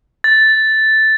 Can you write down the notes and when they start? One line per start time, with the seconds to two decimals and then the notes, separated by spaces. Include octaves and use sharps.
0.24 A6